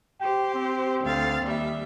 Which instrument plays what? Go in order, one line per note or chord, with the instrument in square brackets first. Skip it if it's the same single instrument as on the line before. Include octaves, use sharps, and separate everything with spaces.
[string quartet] G4 C5 [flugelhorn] G5
[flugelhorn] C4
[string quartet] D2 F5 A6
D#2 G3 E5